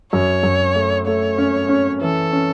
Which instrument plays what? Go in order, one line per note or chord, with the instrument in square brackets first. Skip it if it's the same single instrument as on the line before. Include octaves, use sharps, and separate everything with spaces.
[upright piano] F#2 [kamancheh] C#5
[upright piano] F#2
A3
[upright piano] A3 [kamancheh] C#5
[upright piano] C#4
C#4
[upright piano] E3 [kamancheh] A4
[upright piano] C#4